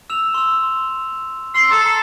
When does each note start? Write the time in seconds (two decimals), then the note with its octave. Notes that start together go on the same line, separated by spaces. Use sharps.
0.10 E6 E7 F7
0.34 C6 E6
1.55 C6 E6 F#7
1.71 A4 A#5